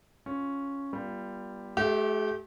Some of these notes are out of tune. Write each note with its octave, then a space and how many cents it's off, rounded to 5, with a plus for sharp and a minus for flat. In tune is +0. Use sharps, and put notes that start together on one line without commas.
C#4 +0 F4 +10
G3 +0 B3 -35 F4 -20
A3 -45 G4 -25 E5 +0